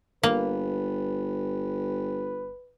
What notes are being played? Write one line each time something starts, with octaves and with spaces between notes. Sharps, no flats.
G1 A#3 B4